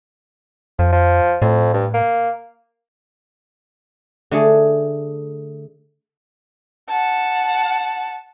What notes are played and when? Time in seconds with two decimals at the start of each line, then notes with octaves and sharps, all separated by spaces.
0.79 F2 F3
0.93 F3
1.42 F2 A2
1.74 G2
1.94 A#3
4.31 D3 A3 G#4
6.89 F#5 A5